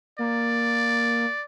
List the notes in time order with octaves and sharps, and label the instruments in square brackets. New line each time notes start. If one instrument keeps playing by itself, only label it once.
[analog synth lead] A#3 [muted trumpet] D5